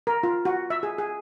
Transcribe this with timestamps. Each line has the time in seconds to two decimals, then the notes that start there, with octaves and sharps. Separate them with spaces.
0.07 A#4
0.23 F4
0.45 F#4
0.70 E5
0.83 G#4
0.98 G#4